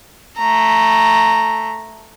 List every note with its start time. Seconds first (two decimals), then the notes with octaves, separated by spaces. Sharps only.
0.38 A3 A#5